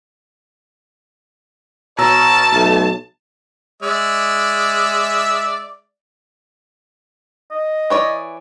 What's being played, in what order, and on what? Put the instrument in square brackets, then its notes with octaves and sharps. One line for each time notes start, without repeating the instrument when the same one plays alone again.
[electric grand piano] B2 A#5 E6 [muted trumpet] C#5 [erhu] A5
[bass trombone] B1 [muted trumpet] A3
[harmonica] G#3 D5 E5
[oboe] D#5
[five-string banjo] E3 C#5 D5